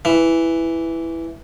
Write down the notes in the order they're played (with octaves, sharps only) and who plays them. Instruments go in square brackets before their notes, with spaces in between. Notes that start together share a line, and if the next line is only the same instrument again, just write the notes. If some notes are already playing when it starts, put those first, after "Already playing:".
[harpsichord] E3